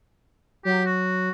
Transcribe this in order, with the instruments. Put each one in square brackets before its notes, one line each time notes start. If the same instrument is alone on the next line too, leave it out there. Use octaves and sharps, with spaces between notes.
[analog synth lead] F#3 [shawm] G4
[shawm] F#4